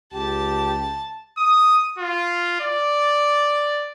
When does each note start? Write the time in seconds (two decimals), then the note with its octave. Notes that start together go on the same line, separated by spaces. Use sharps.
0.13 C#2 G4 A5
1.38 D#6
1.99 F4
2.61 D5